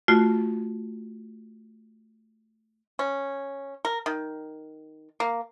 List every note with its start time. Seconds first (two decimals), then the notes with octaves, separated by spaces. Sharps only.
0.08 A3 F4 F#4
2.99 C#4
3.85 A#4
4.06 D#3
5.20 A#3